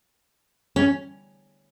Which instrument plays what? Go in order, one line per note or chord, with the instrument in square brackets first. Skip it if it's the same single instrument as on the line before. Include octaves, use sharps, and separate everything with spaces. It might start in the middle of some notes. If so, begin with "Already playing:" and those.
[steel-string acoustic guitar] C#4